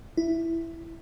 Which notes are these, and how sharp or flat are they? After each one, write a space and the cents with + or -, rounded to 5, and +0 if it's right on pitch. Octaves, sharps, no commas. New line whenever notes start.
E4 +5